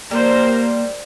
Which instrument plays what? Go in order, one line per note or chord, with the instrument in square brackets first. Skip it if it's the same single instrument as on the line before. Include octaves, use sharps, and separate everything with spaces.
[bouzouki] G3 [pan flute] A#3 [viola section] A#4 C5